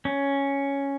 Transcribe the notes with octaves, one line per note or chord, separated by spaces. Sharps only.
C#4